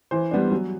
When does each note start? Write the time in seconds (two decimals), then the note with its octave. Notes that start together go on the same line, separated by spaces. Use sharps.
0.11 E3 C5
0.31 G3 B3 D4
0.52 F#3